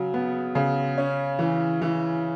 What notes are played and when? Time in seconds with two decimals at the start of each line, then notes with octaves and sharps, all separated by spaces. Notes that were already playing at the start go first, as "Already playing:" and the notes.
Already playing: C#3 F#3
0.14 B3
0.55 C#3
0.98 C#4
1.39 E3
1.82 E3